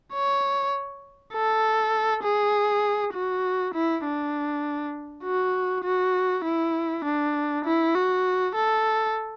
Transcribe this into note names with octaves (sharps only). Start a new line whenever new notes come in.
C#5
A4
G#4
F#4
E4
D4
F#4
F#4
E4
D4
E4
F#4
A4